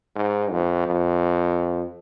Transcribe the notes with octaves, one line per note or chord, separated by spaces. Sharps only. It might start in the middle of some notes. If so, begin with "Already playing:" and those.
G#2
F2
F2